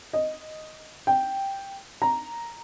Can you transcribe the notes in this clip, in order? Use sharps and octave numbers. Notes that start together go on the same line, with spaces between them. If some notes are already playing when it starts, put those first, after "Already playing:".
D#5
G5
A#5